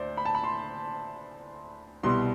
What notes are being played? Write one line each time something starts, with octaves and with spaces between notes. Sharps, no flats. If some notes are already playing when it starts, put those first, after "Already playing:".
Already playing: D2 C5 D5
B5
A5
B5
C6
C2 B2 G3 C6